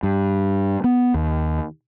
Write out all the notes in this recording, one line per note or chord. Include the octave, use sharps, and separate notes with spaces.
G2
B3
D#2